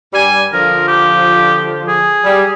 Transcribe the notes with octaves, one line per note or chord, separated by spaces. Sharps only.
G2 G3 G#5
D3 F3 A#4
G4
G#4
G3